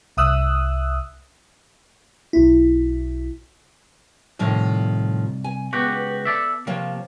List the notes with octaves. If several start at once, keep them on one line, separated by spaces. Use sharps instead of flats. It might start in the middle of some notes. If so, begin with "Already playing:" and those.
C2 E5 D#6 E6 F#6
B1 E4
C2 A2 D#3 F3
G#5
C#2 B3 F#4 G4
A4 D5 E5
C3 F3 A#3 C#5